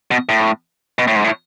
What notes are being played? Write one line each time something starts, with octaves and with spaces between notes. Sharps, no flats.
B2
A2
B2
A2
G#2
A2